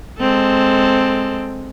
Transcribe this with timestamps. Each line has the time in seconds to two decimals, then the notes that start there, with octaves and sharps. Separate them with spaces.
0.20 G#3 C4 A4